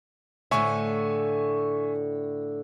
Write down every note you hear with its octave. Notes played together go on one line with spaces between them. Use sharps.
A2 D3 C#5 E5 G#5 C#6